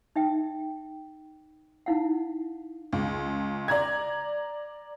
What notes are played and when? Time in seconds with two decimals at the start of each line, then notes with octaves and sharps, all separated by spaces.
0.16 D#4 E5 G5
1.86 D#4 E4 F5 F#5
2.93 C#2
3.68 D5 A#5 G#6